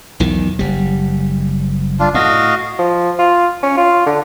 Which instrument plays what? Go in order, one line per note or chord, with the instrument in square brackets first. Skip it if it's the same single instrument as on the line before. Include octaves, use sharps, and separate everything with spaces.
[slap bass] B1 E2 D#3
F#1 G3
[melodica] D4 F4
[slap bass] A2 [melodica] F#4 D#5 F5
[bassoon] F3
F4
C#4
F4
D3